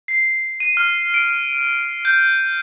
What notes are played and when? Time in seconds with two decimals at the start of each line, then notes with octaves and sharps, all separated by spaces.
0.08 C7
0.60 D#7
0.77 F6
1.14 D7
2.05 G6